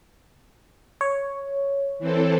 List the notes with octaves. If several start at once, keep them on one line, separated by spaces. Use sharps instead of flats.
C#5
E3 C4 A4